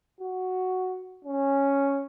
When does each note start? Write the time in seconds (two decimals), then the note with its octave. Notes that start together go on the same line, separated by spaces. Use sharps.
0.20 F#4
1.24 C#4